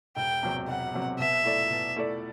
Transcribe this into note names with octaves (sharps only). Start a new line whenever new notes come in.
E1 G5
E2 C3 F#3 C4
E1 F#5
E2 C3 F#3 C4
B2 E5
A3 E4 A4 D5
B2
A3 E4 A4 D5